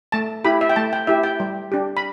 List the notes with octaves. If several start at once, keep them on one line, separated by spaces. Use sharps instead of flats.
A3 A5
E4 G4 B5
E5
G5
A3 A5
G5
E4 G4 E5
G5
G3
D4 G4
B5